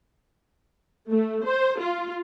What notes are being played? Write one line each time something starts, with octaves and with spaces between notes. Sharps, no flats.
A3
C5
F4